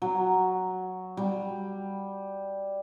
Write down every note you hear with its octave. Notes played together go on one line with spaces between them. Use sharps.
F#3
G3